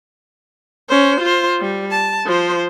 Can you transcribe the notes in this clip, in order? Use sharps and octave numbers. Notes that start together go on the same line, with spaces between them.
C#4 C5
F4 C5
G3
A5
F3 C5